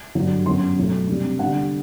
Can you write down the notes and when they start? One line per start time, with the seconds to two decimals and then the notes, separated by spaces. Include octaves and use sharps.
0.15 G2 D3 F#3
0.46 F#2 F#3 B3 C6
0.77 B2 F#3 A3
1.09 C3 G3 D4
1.39 D3 G3 B3 D4 F#5